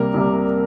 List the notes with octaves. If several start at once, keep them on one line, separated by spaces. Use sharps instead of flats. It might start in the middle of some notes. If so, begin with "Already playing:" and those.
Already playing: C2 C3 G3 A#3 A#4
C2 C3 G3 A#3